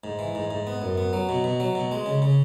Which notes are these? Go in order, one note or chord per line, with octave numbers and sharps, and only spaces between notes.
G#2
E3
G#2
G#2
B3
F#2
B3
F#3
B2
B2
F#3
B2
G#3
C#3
C#3